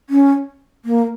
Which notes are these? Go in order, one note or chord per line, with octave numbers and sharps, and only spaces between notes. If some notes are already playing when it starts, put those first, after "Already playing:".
C#4
A#3